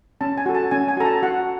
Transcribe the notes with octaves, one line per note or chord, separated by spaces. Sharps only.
C#4 A5
G#5
F#4 A4
A5
C#4 G#5
G#5
F#4 A4 A#5
A5
F#4 F#5